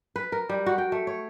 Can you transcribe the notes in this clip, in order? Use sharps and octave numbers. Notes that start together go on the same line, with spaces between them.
B4
A#4
G3
F#4
G5
A3
C#5